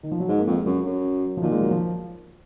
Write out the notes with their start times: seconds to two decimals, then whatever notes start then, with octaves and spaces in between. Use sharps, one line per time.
0.03 D#3
0.11 F3
0.20 F#3
0.28 G#2 G#3
0.39 A#3
0.47 F2 G#3
0.66 F#2 F#3
0.86 F#2
1.37 F3
1.42 A#2 D#3
1.52 G#3
1.61 F#3
1.71 F3